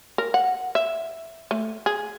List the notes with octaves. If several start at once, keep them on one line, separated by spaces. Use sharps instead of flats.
A#4
F#5
E5
A3
G#4